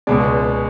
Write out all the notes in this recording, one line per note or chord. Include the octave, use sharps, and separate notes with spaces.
C#2 B2 G#3 D5